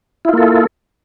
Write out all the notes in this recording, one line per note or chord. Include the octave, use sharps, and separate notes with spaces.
A#3 E4 F4 A4